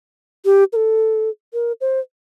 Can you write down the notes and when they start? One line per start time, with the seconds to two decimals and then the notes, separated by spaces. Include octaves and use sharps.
0.45 G4
0.73 A#4
0.76 A4
1.53 A#4
1.81 C5